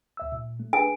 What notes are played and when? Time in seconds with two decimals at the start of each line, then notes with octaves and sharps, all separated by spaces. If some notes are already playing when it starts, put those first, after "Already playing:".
0.17 D2 E5 E6
0.32 A#2
0.60 A3
0.73 D4 G#4 B4 G#5